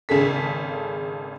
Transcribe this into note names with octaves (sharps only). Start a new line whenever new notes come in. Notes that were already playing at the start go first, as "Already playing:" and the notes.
G#1 C#3 G#4 A4 B6